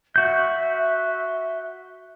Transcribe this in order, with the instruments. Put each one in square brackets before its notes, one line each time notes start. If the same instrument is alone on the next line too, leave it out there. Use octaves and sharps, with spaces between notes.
[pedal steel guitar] F#4 G6 [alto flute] E5